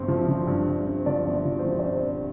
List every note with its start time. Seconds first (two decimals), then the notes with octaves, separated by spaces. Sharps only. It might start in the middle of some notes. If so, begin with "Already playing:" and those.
Already playing: G1 G2 C4
0.08 F3
0.28 F3
0.47 G2
0.68 G2
0.87 C4
1.06 F3 D5
1.26 G1
1.45 F3
1.59 C5
1.65 F3
1.79 D5
1.84 C4 C5
2.04 C4